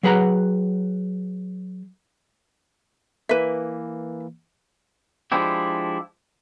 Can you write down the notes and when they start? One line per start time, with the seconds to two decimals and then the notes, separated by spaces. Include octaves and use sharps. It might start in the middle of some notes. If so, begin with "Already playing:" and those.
0.03 F#3 G#4 B4 F#5 A#5
3.29 E3 A#3 B4 E5
5.32 F3 G#3 D4 E4 G4